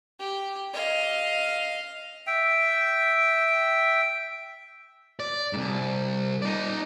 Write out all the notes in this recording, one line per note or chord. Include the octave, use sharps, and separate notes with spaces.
G4
D#5 F5
E5 G5
D5
C2 G#2
D#4 D5